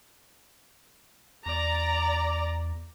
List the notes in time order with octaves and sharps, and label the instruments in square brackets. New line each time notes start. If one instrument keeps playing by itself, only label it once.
[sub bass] E2 [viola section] D5 A#5